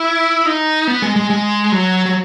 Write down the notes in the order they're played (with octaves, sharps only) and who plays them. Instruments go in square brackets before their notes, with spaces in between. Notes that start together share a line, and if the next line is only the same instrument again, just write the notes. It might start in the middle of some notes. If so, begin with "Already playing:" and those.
Already playing: [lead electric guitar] E4
D#4
B3
G#3
G#3
G#3
F#3
F#3